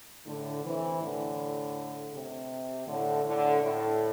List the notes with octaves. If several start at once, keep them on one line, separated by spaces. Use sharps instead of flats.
A2 D3
C3 E3
A2 D3
C3
A2 D3
A2 D3
A2